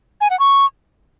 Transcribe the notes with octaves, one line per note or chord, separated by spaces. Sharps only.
G#5
F#5
C#6